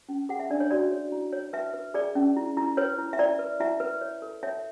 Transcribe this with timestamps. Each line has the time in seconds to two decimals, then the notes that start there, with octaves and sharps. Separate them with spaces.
0.09 C#4
0.29 G#4 F#5
0.40 E5
0.50 D4 D5
0.60 C#5
0.71 F#4 D5
0.91 C#5
1.12 E4
1.32 C#5
1.53 B4 E5
1.74 B4
1.94 G#4 D5
2.15 C#4
2.36 E4
2.57 E4
2.77 B4 C#5
2.98 E4
3.13 E5
3.19 E4 D5
3.39 B4
3.60 E4 E5
3.80 B4
4.01 C#5
4.22 A4
4.43 C#5 E5